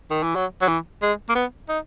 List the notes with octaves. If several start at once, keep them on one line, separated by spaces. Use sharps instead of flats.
D#3
E3
F#3
F#3
E3
G#3
A#3
B3
D#4